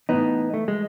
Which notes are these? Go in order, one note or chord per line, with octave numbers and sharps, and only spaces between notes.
A2 E3 B3 D#4
A3
G#3